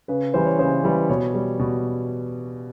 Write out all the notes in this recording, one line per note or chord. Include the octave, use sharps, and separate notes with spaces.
C#3 B4
E3 G3 C5
C#5
C#3 C5
E3 G3
B2 C#5
G3
B2